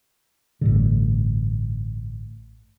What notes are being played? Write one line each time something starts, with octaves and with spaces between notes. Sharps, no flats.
A1 G2 D3